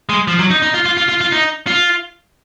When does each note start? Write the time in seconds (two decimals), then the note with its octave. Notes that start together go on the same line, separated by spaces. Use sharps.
0.09 G#3
0.28 F3
0.39 F#3
0.50 D#4
0.62 D#4
0.74 F4
0.86 F4
0.97 F4
1.09 F4
1.21 F4
1.32 D#4
1.67 F4